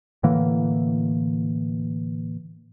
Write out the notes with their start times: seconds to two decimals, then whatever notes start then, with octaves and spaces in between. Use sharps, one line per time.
0.23 A2 D3 E3 A#3